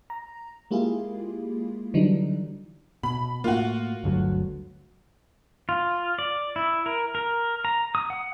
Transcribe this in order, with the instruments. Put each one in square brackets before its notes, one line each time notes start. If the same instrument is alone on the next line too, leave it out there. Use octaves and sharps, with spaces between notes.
[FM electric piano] A#5
G#3 A#3 E4 F4 G4 G#4
D3 E3 F#3 G3 D4 D#4
[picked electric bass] B2 [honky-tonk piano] B5
[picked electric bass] A2 A#3 [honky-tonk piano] F4 F#4
[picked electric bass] G1 D2 F#3
[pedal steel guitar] F4
D5
E4
A#4
A#4
A#5
D#6
F#5